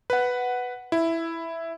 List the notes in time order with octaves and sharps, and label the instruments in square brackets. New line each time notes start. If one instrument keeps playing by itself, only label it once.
[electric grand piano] B4 F#5
E4